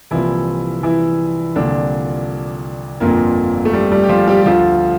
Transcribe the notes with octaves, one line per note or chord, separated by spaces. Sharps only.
C2 A#2 E3 F3 E4
E3 E4
C2 A#2 D3 F3 D4
G1 F2 A#2 D3 F3 A#3
A3
G3
G3
G4
F3 F4
G3 G4
G4
D2 D3 F3 F4